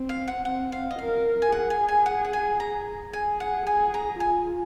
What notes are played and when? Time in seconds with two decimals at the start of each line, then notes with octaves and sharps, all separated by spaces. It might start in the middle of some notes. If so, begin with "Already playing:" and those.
Already playing: C4
0.09 F5
0.28 F#5
0.45 C4 F#5
0.72 F5
0.91 D#5
0.99 A#4 F5
1.42 G#5
1.52 G#4 F#5
1.70 G#5
1.89 G#5
2.06 F#5
2.25 F#5
2.33 G#5
2.60 A#5
3.13 G#4 G#5
3.40 F#5
3.66 G#4 G#5
3.94 A#5
4.20 F4 G#5